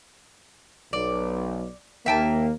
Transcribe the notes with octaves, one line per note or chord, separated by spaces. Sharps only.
B1 D5
D#2 A#3 E5 G5 A5